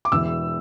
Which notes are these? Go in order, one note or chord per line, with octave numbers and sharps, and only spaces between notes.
D6
E1 E2 E3 E6